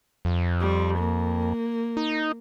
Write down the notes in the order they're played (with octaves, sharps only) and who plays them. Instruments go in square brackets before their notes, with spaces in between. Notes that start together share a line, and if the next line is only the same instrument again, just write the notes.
[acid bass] F2
[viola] G3
A#3
[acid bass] D#4